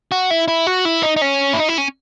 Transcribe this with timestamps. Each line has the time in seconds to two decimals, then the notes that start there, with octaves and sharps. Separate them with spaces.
0.12 F#4
0.30 E4
0.48 E4
0.67 F#4
0.85 E4
1.03 D#4
1.17 D#4
1.21 C#4
1.53 E4
1.59 D#4
1.69 E4
1.78 C#4